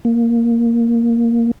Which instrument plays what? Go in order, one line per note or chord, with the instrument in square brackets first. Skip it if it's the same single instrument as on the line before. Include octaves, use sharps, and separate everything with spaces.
[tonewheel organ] A#3